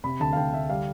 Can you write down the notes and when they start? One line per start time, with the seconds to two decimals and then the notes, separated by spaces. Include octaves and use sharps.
0.04 C3 B5
0.20 D2 A5
0.33 F5
0.37 D2 G5
0.53 D2 E5
0.69 G3 F5